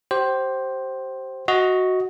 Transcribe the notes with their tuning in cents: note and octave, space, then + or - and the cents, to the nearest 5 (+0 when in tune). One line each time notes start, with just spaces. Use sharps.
G4 -30 C5 +10
F#4 +0 D#5 +20